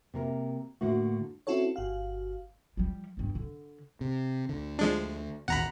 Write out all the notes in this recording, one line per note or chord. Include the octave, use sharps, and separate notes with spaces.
C3 A#3 A#4
A2 D3 A#3 F#4
C4 C#4 E4 F#4 A4 C#5
G1 F#4 F5
F3 G3
E2 G2
D3
C3
D2 D3
F3 G#3 D4
A1 D#2 B2 F#5 A#5 B5